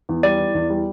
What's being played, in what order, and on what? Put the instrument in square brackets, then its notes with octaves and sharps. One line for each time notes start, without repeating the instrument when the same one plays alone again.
[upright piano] E2
[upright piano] G3 [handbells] D5
[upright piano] E3
E2
G3